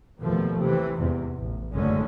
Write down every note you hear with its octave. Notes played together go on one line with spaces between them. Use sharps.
D#2 B2 F3 A3
C3 E3
E2 G#2 C3
A1
F#1 F#2 D3 G#3 A3 C#4